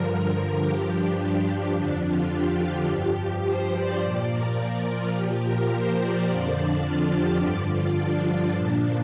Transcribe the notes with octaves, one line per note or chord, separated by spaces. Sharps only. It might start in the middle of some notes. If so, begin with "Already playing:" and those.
Already playing: G2 D3 F3 A#4
G2 F3 G4
D4
D4
F2 D3 F3
F4
G4
G4
G2 F3
C5
D5
A#2 F3 D5
A#4
F4
A#2 F3 G4
A#4
C5
D5
F2 D3 F3
D4
F4
G4
G2 D3 F3 D5
F4
D4
F4
A#2 F3 D4